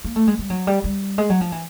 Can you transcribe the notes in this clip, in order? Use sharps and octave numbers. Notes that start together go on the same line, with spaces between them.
A#3
A3
G#3
G3
F#3
G3
G3
G#3
F#3
F3
E3